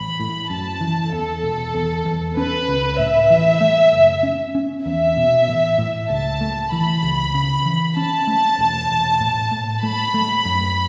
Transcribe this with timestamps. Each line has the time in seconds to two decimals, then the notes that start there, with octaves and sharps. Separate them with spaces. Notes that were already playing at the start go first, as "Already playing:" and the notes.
Already playing: A1 B5
0.20 A2
0.50 F#2 A5
0.81 E3
1.13 E2 A4
1.43 E1
1.75 E2
2.06 E2
2.37 C#4 B4
2.68 C#2
2.99 A2 E5
3.30 E3
3.61 A3
3.93 F#1
4.23 C#4
4.55 C#4
4.85 E2 E5
5.17 B2
5.48 A1
5.78 A2
6.09 C#2 A5
6.41 A3
6.72 E3 B5
7.03 C#2
7.34 C#3
7.66 E3
7.97 C#4 A5
8.27 A3
8.59 E1
8.90 E1
9.21 A2
9.52 A2
9.83 A3 B5
10.14 A3
10.45 F#2